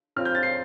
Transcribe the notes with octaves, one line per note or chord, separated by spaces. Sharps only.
F2 F3 C4 F6
G6
A6
C7